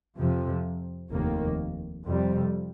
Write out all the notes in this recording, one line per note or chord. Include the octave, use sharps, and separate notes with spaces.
F2 C3 F3
F1 D#2 D#3 A#3
F2 C3 G3